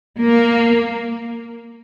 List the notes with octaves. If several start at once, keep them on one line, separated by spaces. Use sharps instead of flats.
A#3